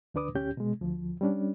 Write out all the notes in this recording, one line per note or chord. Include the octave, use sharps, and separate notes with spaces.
D2 D3 D4 B4 D6 D#6
D2 C#4 G4 G6
B2 G#3
D2 F3
G3 C#4 D4